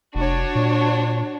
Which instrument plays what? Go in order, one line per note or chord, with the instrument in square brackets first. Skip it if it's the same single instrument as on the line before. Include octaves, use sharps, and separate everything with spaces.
[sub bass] F1 [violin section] D4 F#4 C#5
[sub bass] A#2